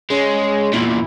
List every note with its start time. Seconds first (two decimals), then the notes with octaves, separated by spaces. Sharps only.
0.10 G#3 C#4
0.73 E2 A#2 E4